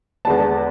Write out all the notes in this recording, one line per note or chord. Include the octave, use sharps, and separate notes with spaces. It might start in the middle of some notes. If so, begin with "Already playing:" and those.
E2 D3 G#3 B3 A5